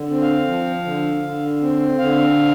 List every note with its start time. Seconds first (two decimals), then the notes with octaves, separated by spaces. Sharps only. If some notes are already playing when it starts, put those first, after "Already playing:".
Already playing: D3
0.09 C4
0.22 F5
0.47 F3
0.85 D3
1.23 D3
1.61 C4
1.99 D3 F5